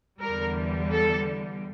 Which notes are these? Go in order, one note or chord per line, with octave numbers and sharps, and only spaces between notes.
E2 D3 G3 A#4
A4